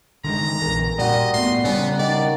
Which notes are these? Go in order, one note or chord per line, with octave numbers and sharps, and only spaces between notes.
D3 D#3 G#3 A#5
A#1 E2 A#4
A#2 G3 F#4 D#5
A2 B3 C6
C#3 G3 B3 C#4
D#3 D5